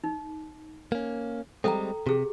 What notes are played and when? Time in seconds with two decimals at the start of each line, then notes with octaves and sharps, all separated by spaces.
0.04 D#4
0.92 A#3 C#4
1.64 G3 G#3 C4 A4 G5 A#5
2.07 C3 G4 G#4